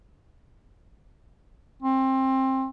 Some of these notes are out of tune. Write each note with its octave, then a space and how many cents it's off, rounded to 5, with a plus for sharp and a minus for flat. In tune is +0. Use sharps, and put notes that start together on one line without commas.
C4 +20